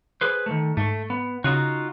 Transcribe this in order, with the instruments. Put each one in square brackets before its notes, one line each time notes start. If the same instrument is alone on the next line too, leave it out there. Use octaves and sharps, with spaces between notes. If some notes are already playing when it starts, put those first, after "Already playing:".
[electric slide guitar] G#4 B4 C5
D#3 F3 A3
[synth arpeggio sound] G#2 [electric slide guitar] A3
[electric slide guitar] B3
[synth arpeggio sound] C#3 [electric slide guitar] D#4 F4 F#4